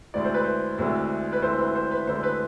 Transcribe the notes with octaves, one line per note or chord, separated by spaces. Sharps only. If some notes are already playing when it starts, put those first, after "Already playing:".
D2 D3 G#3 C4 E4 D5
C5
B4
C5
D2 D3 G#3 C4 E4
B4
D2 D3 G#3 C4 E4 C5
B4
C5
B4
D2 D3 G#3 C4 E4 C5
B4